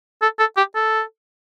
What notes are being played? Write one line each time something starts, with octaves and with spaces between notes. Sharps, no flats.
A4
A4
G4
A4